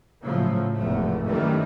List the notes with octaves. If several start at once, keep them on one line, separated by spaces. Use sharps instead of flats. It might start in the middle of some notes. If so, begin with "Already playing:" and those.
A2 C#3 F3 F#3 A3
F1 E2 G#2 F3 A3
F#2 D#3 E3 G3 A3